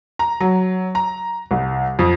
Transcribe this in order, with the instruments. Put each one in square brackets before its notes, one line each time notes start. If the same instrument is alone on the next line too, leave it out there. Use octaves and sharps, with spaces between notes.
[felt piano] A#5
F#3
A#5
C2
F2